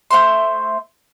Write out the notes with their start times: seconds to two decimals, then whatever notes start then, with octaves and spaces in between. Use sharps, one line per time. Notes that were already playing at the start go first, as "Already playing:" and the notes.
0.11 A3 C5 E5 C6